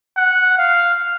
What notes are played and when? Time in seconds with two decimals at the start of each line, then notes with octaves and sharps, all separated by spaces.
0.17 F#5
0.58 F5